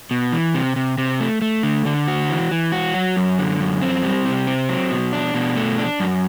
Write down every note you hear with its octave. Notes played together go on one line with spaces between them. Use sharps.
B2
E3
C3
C3
C3
A3
A3
D3
D3
F#4
E3
E3
F#4
F#3
F#2
D3
F#2
C4
G3
C3
C4
F#3
B2
D4
B2
A3
D4
F#2